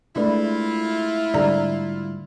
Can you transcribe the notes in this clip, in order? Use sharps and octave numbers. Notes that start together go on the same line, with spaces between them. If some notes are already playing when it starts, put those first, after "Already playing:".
G#3 A3 D4 E4 F4 B4 D5
G#2 D3 G3 D5 A#5